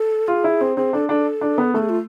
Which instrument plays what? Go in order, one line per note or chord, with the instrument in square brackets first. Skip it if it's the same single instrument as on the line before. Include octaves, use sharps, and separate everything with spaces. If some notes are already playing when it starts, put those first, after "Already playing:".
Already playing: [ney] A4
[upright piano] F4 [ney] G#4
[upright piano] E4
C4
[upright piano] C4 [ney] G#4
[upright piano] D4 [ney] A4
[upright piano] D4 [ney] A4
[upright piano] D4
B3
[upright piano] A3 [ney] A4
[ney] G#4
F4